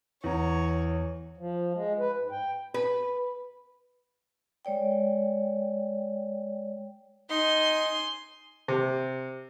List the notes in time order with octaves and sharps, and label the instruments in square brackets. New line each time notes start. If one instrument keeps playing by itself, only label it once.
[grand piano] E2 A#5 [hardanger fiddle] C#5
[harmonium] F3
G#3
B4
G#2
G5
[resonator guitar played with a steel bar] B4
[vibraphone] G#3 C#5 D5 G5
[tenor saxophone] D#4 [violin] G#5 C6
[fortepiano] C3